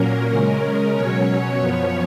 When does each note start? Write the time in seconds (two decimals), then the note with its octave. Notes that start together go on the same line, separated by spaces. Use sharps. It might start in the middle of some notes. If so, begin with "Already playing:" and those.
Already playing: A#2 F#3 A#3 C#4 A#4
0.31 C#3 G#3 C#4
0.94 B2 F#3 C#4 C#5
1.58 F#2 F3 B3